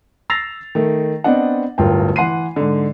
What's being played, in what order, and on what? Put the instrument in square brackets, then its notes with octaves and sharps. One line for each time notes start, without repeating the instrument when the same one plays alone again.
[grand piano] E6 A6 A#6 C7 F7
D#3 A3
B3 C4 D4 D#5 F#5
D1 G1 F4 A#4 G5
E3 F#5 C6 C7 D#7
G#2 D3